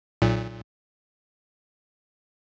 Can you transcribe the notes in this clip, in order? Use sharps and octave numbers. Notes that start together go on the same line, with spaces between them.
B1 A#2